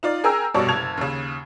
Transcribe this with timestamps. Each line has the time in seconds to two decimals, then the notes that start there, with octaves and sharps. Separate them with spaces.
0.03 D#4 F4 D5
0.24 G#4 A#4 G5 G#5 A#5 E6
0.54 F1 G2 B2 C#5 D5 A5
0.68 F#1 A5 G#6 F7
0.97 D#2 C#3